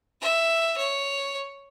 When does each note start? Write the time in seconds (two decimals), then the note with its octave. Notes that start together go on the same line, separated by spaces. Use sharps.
0.21 E5
0.78 C#5